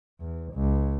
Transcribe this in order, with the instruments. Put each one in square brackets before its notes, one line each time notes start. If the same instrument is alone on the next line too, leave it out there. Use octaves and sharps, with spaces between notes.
[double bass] E2
C#2